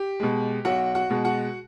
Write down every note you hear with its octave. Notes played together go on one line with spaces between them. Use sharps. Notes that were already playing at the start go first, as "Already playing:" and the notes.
Already playing: G4
B2 G#3
B1 F#4 F#5
F#4 F#5
B2 G#3
F#4 F#5